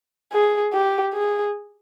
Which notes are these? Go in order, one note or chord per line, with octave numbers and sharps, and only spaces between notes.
G#4
G4
G#4